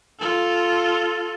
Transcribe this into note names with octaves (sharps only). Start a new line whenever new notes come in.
F4 A4